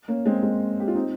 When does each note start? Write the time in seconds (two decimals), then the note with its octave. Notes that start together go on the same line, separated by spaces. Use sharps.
0.08 A#3 C#4
0.26 G#3 C4
0.43 G#3
0.80 G4
0.88 F4
0.95 C4 D#4